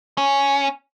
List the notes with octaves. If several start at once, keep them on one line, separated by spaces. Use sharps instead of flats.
C#4